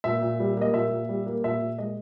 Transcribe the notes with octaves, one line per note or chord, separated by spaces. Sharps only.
A#2 E5
A#2
G3
A#3 D#5
A#2 E5
A#2
G3
A#3
A#2 E5
A#2
G#3 D#5